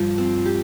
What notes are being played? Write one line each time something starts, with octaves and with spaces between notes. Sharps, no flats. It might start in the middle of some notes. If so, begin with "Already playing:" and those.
Already playing: G2 F3
C4
G4